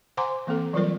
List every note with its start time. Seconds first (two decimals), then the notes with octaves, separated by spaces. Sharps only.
0.17 C5 F#5 G#5 A#5 C6 D6
0.47 E3 A#3 C4 A4
0.73 E3 F#3 G3 F4 A#4 D5